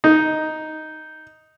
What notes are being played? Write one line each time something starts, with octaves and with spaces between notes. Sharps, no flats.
D#4